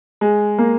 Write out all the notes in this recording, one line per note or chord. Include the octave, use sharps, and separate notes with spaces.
G#3
A#3